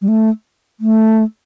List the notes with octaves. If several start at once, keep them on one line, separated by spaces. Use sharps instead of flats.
G3
A3
A3